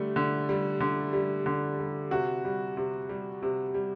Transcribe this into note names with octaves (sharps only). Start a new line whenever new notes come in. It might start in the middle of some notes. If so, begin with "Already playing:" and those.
Already playing: D3 G3 A3
D3
G3
D3
G3
D3
G3
C3 F#4
G3
C3
G3
C3
G3